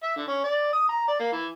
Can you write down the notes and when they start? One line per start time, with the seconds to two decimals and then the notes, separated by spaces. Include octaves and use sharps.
0.03 E5
0.16 D3
0.28 C#4
0.44 D5
0.73 D#6
0.89 A#5
1.08 D5
1.19 A#3
1.32 E3